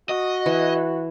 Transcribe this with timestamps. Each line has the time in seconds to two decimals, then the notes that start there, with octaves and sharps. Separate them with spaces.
0.09 F#4 D#5
0.46 E3